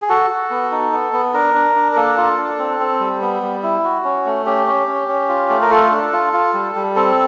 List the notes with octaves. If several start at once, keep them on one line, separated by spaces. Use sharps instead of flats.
G#4
F#4 A4
F#4
B3
D#4
B3
B3
D4 A#4
D4
D4
A#4
A#3 A4
F4
D4
C4
C4
G3
B3
G3
E4
F#4
C#4
A3
C#4 G4
C#4
C#4
C#4
F4
A3
A#4
F4 A4
D4
F4
F4
G3
G3
C4 A4